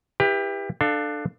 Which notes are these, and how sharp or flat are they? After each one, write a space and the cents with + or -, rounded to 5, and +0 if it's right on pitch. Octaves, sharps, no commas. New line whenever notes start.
E4 +0 G4 +25 B4 -15
D4 +20 A4 +0 F5 +0